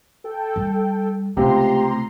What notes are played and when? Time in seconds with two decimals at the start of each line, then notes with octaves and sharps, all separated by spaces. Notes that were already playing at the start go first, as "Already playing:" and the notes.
0.24 A4 G5
0.56 G3
1.37 C#2 C3 A3 G4 A#5 C6